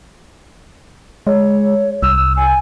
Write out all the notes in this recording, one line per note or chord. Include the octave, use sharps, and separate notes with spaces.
G#3 C#5
C2 E6
G#5